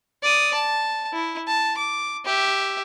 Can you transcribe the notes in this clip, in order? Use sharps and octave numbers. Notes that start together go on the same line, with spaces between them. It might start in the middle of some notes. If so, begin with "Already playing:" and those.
D5 D#6
A5
E4
A5
D6
G4 E5